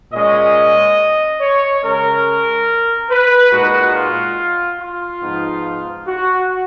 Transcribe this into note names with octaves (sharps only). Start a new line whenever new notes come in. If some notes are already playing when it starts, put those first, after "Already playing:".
A#2 G#3 C#4 D#5
C#5
C#3 G#3 C#4 A#4
B4
A#2 G#3 D#4 F#4
F4
F4
G#2 F3 B3 D#4
F#4